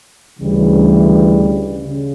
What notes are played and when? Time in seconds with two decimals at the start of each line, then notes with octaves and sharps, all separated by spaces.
0.39 D2 C#3 E3 G3
1.84 C#3